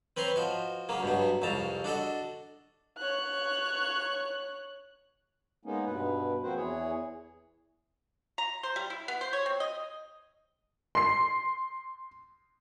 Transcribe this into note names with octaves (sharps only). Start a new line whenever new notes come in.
C4 B4 C#5 A#5 C6
F3 F#4 D#5
C#3 F#3 A#3
G2 B2 F#3
C2 F2 C#3 A5 A#5
D4 F#4 A4 D#5
C#5 F#6
G#3 A#3 B3 C#4 D#4
G2 B2 B4
F3 A#3 C4 F#4 B4 C5
E2 E3 G#4 C#5
A#5
C5
G3
E4
B3
C5
C#5
C4
D#5
C6 C7